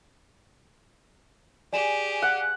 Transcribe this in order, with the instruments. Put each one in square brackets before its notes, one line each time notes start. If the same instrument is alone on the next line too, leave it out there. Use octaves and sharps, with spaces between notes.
[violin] G4 G#4 [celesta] D5 G#5 E7
[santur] F#5